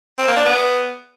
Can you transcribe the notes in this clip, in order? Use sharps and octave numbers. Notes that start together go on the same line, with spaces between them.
C4
A#3
D4
B3